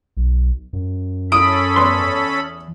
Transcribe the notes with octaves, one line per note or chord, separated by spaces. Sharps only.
B1
F#2
C#4 A4 B5 D#6 D7
E2 B4 C6